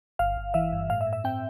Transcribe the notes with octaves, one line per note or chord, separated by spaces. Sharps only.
G1 F5
G1
E3 E5
G2
A2 F5
E5
A2
E5
C4 G5